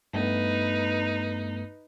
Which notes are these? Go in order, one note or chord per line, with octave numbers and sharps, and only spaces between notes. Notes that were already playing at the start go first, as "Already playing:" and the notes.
G2 A3 B3 D#4 B4